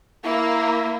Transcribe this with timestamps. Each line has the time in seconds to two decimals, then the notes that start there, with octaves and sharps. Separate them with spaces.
0.24 A#3 E4